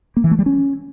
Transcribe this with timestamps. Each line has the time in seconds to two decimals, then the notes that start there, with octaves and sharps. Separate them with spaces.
0.17 A#3
0.24 E3
0.31 A3
0.39 G3
0.46 C#4